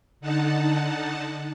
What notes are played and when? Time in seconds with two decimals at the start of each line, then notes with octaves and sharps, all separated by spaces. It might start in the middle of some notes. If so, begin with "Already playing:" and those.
0.21 D3 D#4 F#5 A5